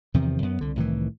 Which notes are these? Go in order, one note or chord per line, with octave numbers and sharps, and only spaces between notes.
E2 C3 D#3 F3
F#2 B3
C2 D3
C2 A2 D#3 E3